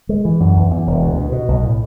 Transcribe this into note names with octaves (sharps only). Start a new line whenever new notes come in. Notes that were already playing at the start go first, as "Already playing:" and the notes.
G#3
E3
F#2
E2
E2
E1
D2
B2
B2
B1
A2